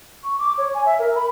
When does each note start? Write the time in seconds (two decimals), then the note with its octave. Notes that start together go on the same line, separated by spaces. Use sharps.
0.24 C#6
0.39 D6
0.58 C#5
0.74 G#5
0.85 E5
0.99 A#4
1.15 B5